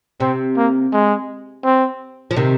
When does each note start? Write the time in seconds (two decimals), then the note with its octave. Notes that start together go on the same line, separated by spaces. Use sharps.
0.20 C3 C4
0.57 A#3
0.93 G#3
1.64 C4
2.31 F3
2.36 C3 D#3